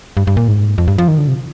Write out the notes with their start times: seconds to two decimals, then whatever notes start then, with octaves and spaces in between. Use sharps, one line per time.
0.17 G2
0.27 G2
0.37 A#2
0.48 G#2
0.78 F2
0.88 G2
0.98 F3
1.08 D#3
1.18 D3
1.28 C3